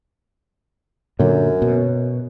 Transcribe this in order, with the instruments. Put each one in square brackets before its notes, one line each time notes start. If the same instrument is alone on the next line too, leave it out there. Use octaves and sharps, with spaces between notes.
[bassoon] F#2 [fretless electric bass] A#2 D3 F#3
[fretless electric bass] B2